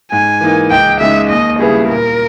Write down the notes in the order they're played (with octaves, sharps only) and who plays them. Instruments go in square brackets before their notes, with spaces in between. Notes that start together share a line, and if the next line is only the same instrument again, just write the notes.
[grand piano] G#2 [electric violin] G#5
[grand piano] E3 A#3 D#4
[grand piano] C#2 [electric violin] G5
[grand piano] C#3 G#3 D#4 [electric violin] E5
[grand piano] D#2 [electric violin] D#5
[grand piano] C#3 G3 B3 E4 [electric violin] G#4
[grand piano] A#2 [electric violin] A#4